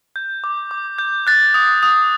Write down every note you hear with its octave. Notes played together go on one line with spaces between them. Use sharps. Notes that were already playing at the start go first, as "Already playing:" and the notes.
G6
D6
D6
G6
F#6 A6
D#6
D#6